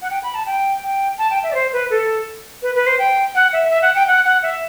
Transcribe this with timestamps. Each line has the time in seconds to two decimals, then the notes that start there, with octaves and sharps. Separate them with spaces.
0.02 F#5
0.10 G5
0.23 B5
0.35 A5
0.46 G5
0.83 G5
1.18 A5
1.30 G5
1.43 E5
1.51 D5
1.55 C5
1.73 B4
1.90 A4
2.63 B4
2.75 B4
2.87 C5
2.99 G5
3.35 F#5
3.53 E5
3.70 E5
3.82 F#5
3.95 G5
4.07 F#5
4.25 F#5
4.43 E5